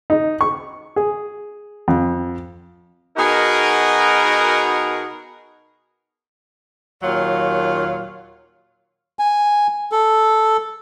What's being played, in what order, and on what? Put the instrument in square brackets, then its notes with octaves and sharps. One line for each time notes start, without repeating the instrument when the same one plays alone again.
[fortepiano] D#4
C#6
G#4
F2
[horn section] B2 D#4 F#4 G#4 A#4
[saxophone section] D#2 A#2 F#3 F4 C#5 F5
[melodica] G#5
A4